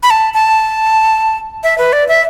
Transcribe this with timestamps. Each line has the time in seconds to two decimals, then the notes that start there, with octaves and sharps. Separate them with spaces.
0.03 B5
0.10 A5
0.34 A5
1.63 E5
1.78 B4
1.93 D5
2.08 E5